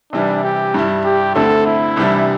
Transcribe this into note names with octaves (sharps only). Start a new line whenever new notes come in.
C3 E3 G3 D4
G4
G2 G3 E4
G4
D2 D3 C4 E4 A4
E4
C2 C3 E3 G3 D4